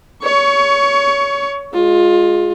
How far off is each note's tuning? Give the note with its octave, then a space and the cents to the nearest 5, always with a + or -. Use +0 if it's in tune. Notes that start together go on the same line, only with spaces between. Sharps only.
C#5 +25 C#6 +10
G#3 +0 F4 +20